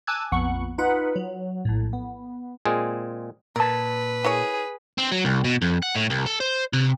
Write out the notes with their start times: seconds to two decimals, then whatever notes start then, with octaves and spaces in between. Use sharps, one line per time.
0.07 G#5 A5 D6 E6 F#6 G#6
0.32 A#1 F2 B3 F#5 C#6
0.78 D#4 F4 B4 F#5
1.16 F#3
1.65 A#1 A2
1.93 B3
2.66 A#2 G#3 C4 G#4
3.56 A#2 A#4 B4 A5
4.25 E4 G#4 A#4 C#5
4.98 C4
5.12 F#3
5.25 C2
5.44 B2
5.62 F2
5.82 F#5
5.95 A2
6.10 C2
6.26 A4
6.40 C5
6.73 C3